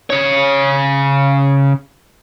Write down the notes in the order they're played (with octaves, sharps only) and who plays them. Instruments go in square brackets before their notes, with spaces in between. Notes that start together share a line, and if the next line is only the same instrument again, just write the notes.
[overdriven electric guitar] C#3 C#5